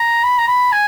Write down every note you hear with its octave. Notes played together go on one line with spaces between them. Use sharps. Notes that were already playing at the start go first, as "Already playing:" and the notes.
Already playing: A#5
B5
A#5
B5
G#5